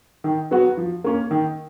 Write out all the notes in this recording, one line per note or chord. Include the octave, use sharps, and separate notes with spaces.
D#3
F#3 B3 F#4
F3
A#3 C#4
D#3